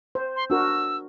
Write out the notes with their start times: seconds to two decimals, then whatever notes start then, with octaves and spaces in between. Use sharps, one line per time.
0.15 C5
0.36 C6
0.50 D4 F#4 A#4 E6